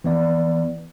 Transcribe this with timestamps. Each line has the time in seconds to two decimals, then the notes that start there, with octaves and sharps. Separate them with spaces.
0.04 E3 B3 D5